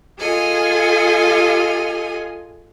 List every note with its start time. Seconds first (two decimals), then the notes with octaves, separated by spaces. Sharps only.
0.19 F4 G#4 A4 D#5 G#5